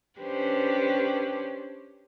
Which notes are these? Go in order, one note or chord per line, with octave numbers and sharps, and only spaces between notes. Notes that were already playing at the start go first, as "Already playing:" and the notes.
C#4 D4 G4 B4 C5